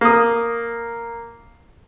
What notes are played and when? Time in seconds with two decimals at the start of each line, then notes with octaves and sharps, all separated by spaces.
0.01 A#3 D#6